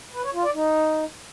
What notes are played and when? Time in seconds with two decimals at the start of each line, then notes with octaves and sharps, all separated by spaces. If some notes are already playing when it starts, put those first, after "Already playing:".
0.13 B4
0.24 C#5
0.34 F4
0.44 D5
0.54 D#4